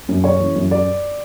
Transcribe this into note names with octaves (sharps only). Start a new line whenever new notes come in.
F#2
C#3 C#5
E3
F#2
D5